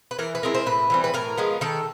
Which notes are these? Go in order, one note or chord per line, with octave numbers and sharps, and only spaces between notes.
B4
E3 A#4
B4
G#3 C4 E4 A#4
C5
A2 B4
E3 G3 C4
B4
A2 A#4
F3 G#3 B3
D#3 A4